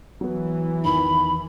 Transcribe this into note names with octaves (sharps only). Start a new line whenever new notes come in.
E3 F#3 B3
E2 D#3 B5